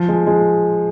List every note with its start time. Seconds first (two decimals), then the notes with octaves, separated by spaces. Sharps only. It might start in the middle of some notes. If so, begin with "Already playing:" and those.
Already playing: F3
0.09 G#3
0.27 G#3